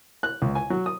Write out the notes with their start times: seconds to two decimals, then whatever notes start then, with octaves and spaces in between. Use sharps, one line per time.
0.23 F#6
0.42 C#2
0.55 G#5
0.70 F#3
0.86 D#6